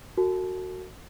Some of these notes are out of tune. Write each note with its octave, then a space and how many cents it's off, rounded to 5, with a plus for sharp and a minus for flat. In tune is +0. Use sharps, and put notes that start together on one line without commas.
F#4 +0 A#4 -45 A5 -25